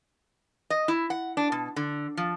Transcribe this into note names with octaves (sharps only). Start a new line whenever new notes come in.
D#5
E4
F#5
D4
B2
D3
F3